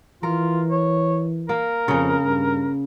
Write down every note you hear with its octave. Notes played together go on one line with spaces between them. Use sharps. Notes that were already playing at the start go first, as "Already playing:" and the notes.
E3 F4 A#4
C#5
A#3 A#4
F2 C#3 C#4
G2